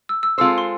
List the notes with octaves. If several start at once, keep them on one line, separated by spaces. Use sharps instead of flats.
E6
E6
G#3 C4 F4 A4 C5 E6
C6